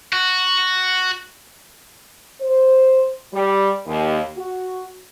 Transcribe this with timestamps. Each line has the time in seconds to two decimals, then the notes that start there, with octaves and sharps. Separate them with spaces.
0.13 F#4
2.41 C5
3.34 G3
3.86 D#2
4.38 F#4